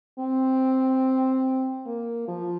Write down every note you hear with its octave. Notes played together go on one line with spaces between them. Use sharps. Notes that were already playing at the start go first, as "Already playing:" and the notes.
C4
A#3
F3